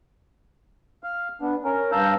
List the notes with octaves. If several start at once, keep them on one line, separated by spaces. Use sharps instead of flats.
F5
B3 D4
C#4 A#4
G2 F5 A5 A#5 E6 G6